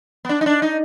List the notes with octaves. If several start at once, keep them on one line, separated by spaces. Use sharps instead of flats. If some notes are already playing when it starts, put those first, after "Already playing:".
B3
D4
D#4
D4
D#4